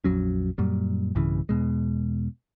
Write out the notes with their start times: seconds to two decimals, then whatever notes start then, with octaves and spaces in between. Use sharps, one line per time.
0.04 A#1 F2 F#3 C#4
0.58 F#2 A#2 G3
1.15 B1 G2 C#3 E3
1.49 E2 B2 G#3